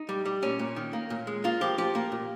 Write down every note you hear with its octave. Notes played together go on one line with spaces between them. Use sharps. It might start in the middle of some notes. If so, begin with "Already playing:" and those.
Already playing: D#4
G3
G3
A#2 C#4
A#2
D#3
A#3
A#2
G#3
A#3 F4
F3 G4
F3 G4
A#3
A#2